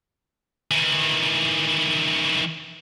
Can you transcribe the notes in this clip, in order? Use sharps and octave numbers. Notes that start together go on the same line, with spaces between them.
D#3 E3